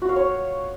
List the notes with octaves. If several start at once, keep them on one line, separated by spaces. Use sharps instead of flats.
F#4
F5
C#5